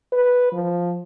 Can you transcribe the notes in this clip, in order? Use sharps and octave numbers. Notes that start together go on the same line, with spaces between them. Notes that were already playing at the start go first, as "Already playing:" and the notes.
B4
F3